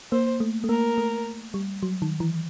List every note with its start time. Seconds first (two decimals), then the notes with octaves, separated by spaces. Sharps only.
0.12 A#3 C5
0.40 A3
0.64 A3
0.69 A#3 A#4
0.98 A3
1.54 G3
1.83 F#3
2.02 D#3
2.20 E3